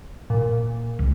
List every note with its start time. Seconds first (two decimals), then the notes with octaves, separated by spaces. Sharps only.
0.30 A#2
0.99 C#2